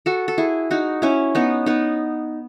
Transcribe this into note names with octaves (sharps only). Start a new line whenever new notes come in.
F#4 A4
A4
E4 G#4
D#4 F#4
C#4 E4
B3 D#4
B3 D#4